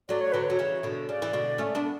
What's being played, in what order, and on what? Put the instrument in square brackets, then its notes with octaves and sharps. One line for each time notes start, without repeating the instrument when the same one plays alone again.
[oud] F#3 A3 [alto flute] D5
[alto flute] C#5
[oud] D3 F#3 [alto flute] B4
[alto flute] C#5
[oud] F#3
C#3 E3
B2 D3
[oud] C#3 [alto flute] D5
[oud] E3
B2 D3
A3 C#4
B3 D4